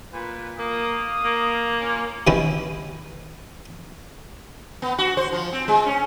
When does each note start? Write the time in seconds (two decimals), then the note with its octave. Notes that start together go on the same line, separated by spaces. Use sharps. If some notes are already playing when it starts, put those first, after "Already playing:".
0.13 A#2 B4
0.59 A#3 F5 D#6
1.24 A#3
1.79 C#4 F4
2.27 C3 D#3 B3 C#4 E4
4.82 B3
4.98 F#4
5.17 C5
5.32 F3
5.53 C4
5.68 G#3
5.86 C#4